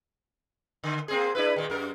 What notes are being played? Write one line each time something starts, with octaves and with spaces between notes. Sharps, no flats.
D3
A#3 C4 G#4
D4 E4 B4
A#2 D#3
F#2 A#4